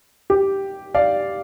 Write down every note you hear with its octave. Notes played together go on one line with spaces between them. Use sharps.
G4
D5 F5